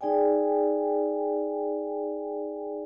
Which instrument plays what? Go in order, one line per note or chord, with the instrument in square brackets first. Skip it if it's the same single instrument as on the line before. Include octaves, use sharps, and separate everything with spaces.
[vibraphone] D#4 G#4 D5 G5 G#5